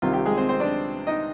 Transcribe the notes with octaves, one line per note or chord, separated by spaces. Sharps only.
C2 C3 D#3 F4
G4
G#3 G#4
C4 C5
C4 C5
D4 D5
D#4 D#5